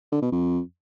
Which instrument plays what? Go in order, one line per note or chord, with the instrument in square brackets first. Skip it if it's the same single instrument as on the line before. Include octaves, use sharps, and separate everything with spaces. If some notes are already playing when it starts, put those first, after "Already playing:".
[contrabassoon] D3
B2
F2